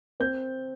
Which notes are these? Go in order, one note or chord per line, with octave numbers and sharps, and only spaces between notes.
C4 G6